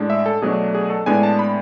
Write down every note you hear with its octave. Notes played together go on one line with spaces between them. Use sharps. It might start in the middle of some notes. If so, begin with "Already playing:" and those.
Already playing: A2 G#3 D4
E5
A4
B2 F#3 A3 D4 G#4
G#4
A4
A2 G#3 B3 D4 G#5
A5
B5